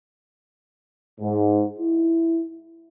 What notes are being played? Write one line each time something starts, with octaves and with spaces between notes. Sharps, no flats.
G#2
E4